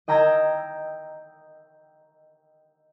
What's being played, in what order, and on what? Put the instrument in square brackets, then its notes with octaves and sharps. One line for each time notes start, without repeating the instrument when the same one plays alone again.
[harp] D#5 G5 A#5 E6 G#6 A#6